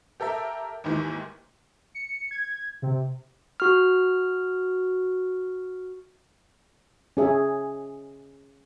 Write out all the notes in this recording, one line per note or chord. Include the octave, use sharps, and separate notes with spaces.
G4 A4 A#4 E5
D#2 G#2 D#3 E3
C#7
G#6
C3
F#4 F6
C#4 G#4 E5 A5